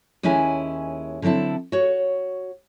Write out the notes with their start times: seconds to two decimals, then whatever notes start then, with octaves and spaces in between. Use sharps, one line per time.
0.23 D#2 G#3 C#4 E4 G#5
1.22 D3 F#3 C4 E4 A5
1.72 F#4 C#5